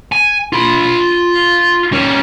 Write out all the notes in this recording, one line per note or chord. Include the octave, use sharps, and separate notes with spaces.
G#5
F4 B5
G3 C#4